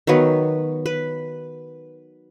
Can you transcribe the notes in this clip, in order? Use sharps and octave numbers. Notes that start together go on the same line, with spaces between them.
D#3 F#3 B3 B4
B4